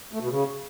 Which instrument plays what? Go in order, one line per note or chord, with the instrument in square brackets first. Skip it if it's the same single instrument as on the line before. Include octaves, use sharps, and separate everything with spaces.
[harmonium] A3
B2
C#3